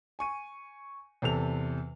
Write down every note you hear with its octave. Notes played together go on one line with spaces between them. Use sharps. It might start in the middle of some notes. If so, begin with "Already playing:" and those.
G#5 C#6 D#7
E2 C3 A4 F7